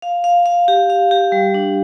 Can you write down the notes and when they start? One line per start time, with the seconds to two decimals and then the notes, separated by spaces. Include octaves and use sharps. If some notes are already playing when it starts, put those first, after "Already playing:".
0.02 F5
0.24 F5
0.46 F5
0.68 G4
0.90 F5
1.11 G4
1.32 G3
1.54 D4